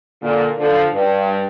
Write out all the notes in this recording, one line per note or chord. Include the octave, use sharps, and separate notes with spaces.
A#2 D3
D3 F3
G2